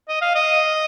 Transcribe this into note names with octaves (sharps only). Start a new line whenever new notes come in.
D#5
F5
D#5